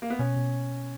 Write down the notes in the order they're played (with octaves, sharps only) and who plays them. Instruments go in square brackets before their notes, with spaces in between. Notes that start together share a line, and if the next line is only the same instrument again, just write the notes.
[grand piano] A#3
B3
[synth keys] B2 [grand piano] C#4
[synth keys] B2